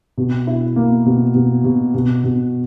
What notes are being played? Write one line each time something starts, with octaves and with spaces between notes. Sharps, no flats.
B2
E4
A#3
B2
B2
B2
B2
B2